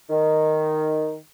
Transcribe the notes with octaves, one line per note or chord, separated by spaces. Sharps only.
D#3